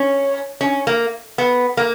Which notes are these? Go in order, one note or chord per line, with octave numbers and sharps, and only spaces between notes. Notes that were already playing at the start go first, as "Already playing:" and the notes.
Already playing: C#4
C#4
A#3
B3
A#3